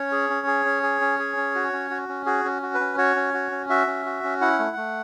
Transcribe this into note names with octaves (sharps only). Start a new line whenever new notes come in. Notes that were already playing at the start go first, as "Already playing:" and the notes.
Already playing: C#4 C#5
G#4
C#4
G#4
C#4
G#4
C#4
G#4
C#4
F#4
C#4
F#4
C#4
F#4 G#4
C#4
F#4
B4
C#4
F#4 C#5
C#4
F#4
C#4
F#4 E5
C#4
F#4
C#4
E4 F#5
A3
A3